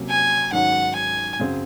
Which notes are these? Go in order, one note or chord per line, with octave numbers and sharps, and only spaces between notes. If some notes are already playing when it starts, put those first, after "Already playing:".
Already playing: C3 F#3 A#3 C#4
G#5
G#2 D#3 F#3 C#4 F#5
G#5
F#2 C#3 F#3 C4